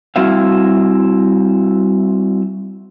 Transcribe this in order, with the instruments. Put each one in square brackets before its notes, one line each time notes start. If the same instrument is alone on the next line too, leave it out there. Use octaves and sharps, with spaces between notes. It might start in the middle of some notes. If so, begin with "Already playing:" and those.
[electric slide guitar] G3 C4 E4 F#4 E5 F5